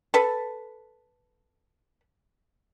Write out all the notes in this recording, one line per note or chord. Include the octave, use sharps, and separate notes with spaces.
A4 B4